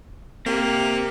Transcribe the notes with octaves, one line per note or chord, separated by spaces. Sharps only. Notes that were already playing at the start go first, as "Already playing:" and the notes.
A#3 C4 G4